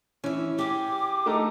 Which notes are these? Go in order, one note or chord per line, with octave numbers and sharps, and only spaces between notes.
E3 C#4 E5
G4 G#4 D6
A3 D#4 A#4